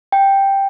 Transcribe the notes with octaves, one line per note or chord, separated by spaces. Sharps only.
G5